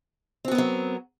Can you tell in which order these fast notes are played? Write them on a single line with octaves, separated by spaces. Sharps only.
C4 F#4 B3 A#4 F#3